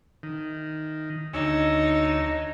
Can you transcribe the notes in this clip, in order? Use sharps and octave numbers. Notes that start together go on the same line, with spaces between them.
D#3
D2 D#4 C#5 E6